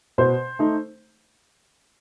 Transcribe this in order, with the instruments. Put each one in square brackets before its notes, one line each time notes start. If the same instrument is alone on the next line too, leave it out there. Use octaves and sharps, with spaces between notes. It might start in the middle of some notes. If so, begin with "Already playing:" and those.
[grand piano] B2 [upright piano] C5
[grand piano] A3 D#4